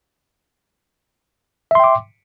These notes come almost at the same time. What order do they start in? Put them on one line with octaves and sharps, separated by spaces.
E5 C6 G5 D6